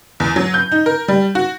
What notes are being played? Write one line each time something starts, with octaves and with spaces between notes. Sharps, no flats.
E2
F#3
G6
D#4
A#4
G3
F#4